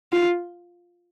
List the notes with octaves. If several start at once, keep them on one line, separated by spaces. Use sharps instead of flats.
F4